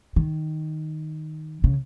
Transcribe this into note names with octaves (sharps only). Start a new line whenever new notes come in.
D#3
C#3